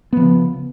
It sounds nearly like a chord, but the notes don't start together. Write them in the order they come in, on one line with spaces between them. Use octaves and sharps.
B3 F3 C#3